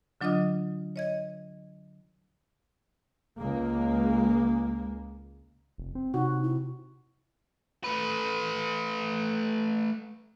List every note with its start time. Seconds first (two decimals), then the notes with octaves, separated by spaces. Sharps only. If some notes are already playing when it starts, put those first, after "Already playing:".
0.21 D3 F#3 D4 F4 D#5 D#6
0.96 C#5 D#5 G#6
3.38 C#2 G#3 A#3
5.78 F1
5.95 C4
6.14 C3 D#4 F#4
6.43 E4
7.84 A3 B4